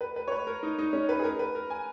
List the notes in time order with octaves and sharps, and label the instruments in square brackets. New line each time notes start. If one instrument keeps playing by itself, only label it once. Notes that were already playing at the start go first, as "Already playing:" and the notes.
[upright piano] B4
B4
C#5
B4
A#4
D#4
D#4
C#4
B4
G#4
A#4
B4
A#4
G#5